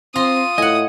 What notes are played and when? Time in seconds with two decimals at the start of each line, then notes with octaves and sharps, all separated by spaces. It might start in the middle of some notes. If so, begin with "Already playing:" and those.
0.15 C4 F4 A#5 C6 D#6
0.58 A2 D#5 F#5 G#5